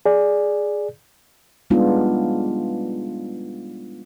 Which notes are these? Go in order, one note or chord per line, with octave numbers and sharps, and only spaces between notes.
G#4 D5
G3 G#3 B3 D4 D#4 F4